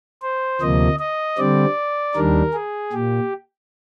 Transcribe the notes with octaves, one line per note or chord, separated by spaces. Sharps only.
C5
D2 C3 F3 A#3 D#5
D#5
D3 G3 C4 D5
D#2 D#3 G3 D4 A#4
G#4
A#2 G4